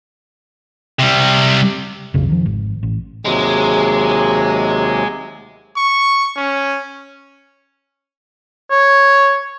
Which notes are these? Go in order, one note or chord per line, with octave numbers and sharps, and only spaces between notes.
C3 G3
B1 F2 C#3
D#3 F3
G#1
A1
D#2 C3 F#3 G#3
C#6
C#4
C#5